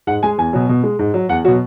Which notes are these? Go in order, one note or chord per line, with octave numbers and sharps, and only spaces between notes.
G#2 F#5
G#3 G#5
E2 G#5
B2 F#3
B2
G#3
G#2
F#3
E2 F#5
B2 F#3 F#4